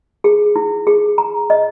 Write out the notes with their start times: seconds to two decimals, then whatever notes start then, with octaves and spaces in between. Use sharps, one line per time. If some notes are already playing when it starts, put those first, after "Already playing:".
0.24 G#4
0.56 E4
0.87 G#4
1.18 A#5
1.50 D#5